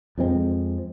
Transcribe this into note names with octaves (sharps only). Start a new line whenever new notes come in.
F2 F3 G#3 C4